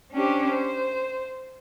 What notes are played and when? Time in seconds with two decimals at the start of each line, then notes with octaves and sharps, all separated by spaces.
0.13 C#4 D4 G4 C5
0.51 C5